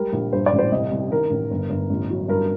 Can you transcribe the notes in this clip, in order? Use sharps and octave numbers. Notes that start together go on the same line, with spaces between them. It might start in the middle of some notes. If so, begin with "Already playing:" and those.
Already playing: G3 A#4
A#1
G2 C5
D5
A1
C5
C2 D#5
C2
D#3 A#4
A1
G1
G1
A1
F#3
G2 A#4